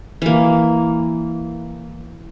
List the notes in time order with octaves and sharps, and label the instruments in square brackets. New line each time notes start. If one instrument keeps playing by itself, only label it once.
[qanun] E3 A#3